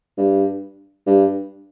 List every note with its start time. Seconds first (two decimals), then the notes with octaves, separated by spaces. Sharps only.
0.18 G2
1.06 G2